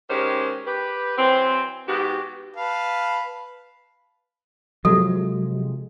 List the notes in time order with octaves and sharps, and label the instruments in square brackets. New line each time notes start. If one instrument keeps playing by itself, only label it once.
[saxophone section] D#3 G#3 C#4 G4 C5
G4 B4
E3 F#3 C4
G#2 B3 F#4 G4
[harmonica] B4 F5 A5
[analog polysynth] C3 F3 G#3 [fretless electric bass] F#3 [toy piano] A4